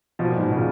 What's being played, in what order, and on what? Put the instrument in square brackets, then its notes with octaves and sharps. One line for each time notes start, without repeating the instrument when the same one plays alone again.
[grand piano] B2 [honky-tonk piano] F3
[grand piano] A#2
G#2 B2
B2
A#2 C#3